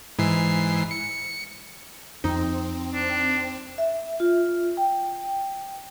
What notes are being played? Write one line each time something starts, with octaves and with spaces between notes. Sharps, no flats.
G#2 E3 C7
C#7
F2 C4 D#4
D4
E5
F4
G5